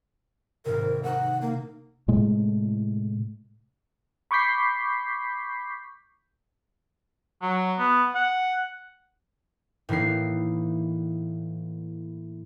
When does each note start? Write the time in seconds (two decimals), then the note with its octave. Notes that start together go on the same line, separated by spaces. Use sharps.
0.65 G#1 G#2 C3 A#4
1.03 A3 D#4 F#5
1.42 A#3
2.08 A2 C3 G#3 A3
4.31 B5 C#6 D6 G6 B6 C7
7.42 F#3
7.79 B3
8.15 F#5
9.89 A2 E3 A#3 D#4 C7